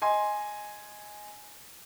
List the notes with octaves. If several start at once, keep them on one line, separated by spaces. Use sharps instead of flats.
D#5 G#5 C6